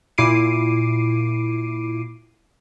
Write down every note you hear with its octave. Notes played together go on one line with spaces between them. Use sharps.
A#2 E4 D6 C7 D7 D#7